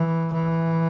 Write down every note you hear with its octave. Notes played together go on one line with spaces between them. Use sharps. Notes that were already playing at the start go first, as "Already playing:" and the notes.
Already playing: E3
E3